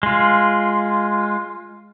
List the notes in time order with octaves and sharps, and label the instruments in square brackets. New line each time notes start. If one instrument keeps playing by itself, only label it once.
[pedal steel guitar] G#3 F4